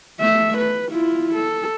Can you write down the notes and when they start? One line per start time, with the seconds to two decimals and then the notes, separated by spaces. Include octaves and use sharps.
0.20 A3 E5
0.58 B4
0.92 E4 F4
1.35 A4